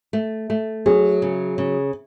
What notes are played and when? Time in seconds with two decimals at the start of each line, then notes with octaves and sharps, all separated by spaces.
0.13 A3
0.50 A3
0.86 F#3 G#4
1.22 C#3
1.58 C#3